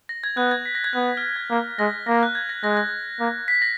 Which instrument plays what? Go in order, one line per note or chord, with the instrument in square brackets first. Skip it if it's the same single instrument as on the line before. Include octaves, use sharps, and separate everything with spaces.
[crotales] A#6
G#6
[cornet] B3 [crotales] F#6
[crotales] G#6
B6
A#6
G#6
[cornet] B3 [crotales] F#6
[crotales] F6
F#6
G#6
[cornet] A#3
[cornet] G#3 [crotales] A#6
[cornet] A#3 [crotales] A#6
[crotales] F#6
G#6
A#6
[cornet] G#3 [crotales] A#6
[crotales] A#6
[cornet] A#3
[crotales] B6
A#6